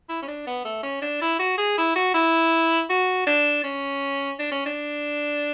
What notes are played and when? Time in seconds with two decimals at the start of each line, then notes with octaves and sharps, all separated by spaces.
0.09 E4
0.22 C#4
0.28 D4
0.47 B3
0.65 A3
0.83 C#4
1.02 D4
1.21 E4
1.39 F#4
1.58 G#4
1.78 E4
1.96 F#4
2.14 E4
2.90 F#4
3.27 D4
3.64 C#4
4.39 D4
4.52 C#4
4.66 D4